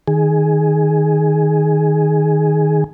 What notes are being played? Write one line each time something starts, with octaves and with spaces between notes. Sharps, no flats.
D#3 G#4